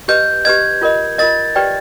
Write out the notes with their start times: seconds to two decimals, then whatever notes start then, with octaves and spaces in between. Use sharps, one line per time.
0.08 G4 B4 D#5 G6
0.45 G4 B4 D#5 G#6
0.81 F4 A#4 D#5
1.18 F4 A#4 D#5 A6
1.56 G4 B4 D5 G5